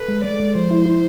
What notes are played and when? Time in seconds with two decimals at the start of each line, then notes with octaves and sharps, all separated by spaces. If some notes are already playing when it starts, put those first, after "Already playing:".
Already playing: A4 B4
0.08 G#3
0.23 G#3 D5
0.40 G#3
0.55 F3 C5
0.71 E4
0.86 E4